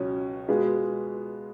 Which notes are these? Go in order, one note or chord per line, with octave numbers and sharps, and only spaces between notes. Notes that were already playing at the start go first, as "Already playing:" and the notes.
Already playing: C#2 B2 F#3 C#4
B2 G#3 B3 F4 G#4